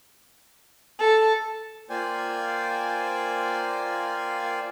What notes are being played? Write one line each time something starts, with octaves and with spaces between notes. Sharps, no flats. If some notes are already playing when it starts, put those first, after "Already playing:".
A4
A#3 F4 C5 D5 G5 G#5